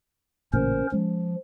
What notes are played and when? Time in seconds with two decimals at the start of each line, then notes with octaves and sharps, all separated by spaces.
0.53 A1 A#2 C#3 C#4 A#4 C5
0.92 F3 G#3 C#4